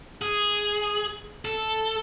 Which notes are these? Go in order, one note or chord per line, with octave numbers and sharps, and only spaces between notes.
G#4
A4